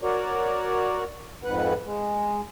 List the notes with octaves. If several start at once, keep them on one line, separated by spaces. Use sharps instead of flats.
F#4 A#4 C#5 D5
F2 G#2 B4 F#5
G#3